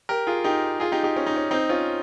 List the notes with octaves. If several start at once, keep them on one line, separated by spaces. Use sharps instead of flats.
G4 A#4
F4 G#4
D#4 G4
F4 G#4
D#4 G4
D#4 G4
C#4
D#4
C#4
C4 D#4
C#4 F4